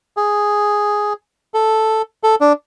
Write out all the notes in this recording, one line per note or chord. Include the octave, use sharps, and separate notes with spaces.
G#4
A4
A4
D4